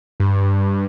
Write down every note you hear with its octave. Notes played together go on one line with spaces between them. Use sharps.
G2